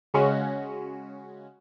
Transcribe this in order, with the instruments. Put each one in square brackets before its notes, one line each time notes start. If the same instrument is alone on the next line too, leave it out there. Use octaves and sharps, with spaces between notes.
[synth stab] C#3 G#3 C#4 F#4